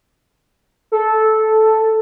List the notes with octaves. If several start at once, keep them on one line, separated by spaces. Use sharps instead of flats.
A4